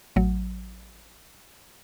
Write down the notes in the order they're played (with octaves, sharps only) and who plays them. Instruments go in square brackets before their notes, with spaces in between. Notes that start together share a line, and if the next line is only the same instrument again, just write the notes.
[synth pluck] A1 F#3